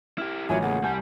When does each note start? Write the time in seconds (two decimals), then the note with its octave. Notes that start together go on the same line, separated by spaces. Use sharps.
0.18 E4 G4 F6
0.49 A1 D#3 F#3 F4 E5 G#5 D#7
0.62 C#2 A3 A#3 G#4 F#5
0.84 C2 G3 G#5 A5 G6